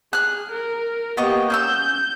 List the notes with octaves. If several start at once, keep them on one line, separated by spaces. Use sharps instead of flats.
G#4 F6 F#6
A#4
A#3 B3 G4 D#5 C#6
C#4 C6 E6 G6